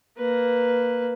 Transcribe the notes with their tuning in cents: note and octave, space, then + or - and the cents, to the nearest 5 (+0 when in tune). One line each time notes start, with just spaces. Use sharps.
A#3 +0 B4 +0